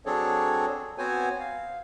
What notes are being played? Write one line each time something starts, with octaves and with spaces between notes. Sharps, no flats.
F#3 C4 D4 G#4 A4 C#5
B3 C4 F#4 C5 C#5 G#5
F5